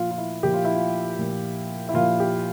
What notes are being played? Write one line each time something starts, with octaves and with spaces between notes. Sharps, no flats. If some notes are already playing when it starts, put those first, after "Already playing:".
Already playing: A#2 F3 F4
F4
E4
A#2 F3 G4
F4
E4
F4
A#2 F3
E4
A#2 F3 F4
G4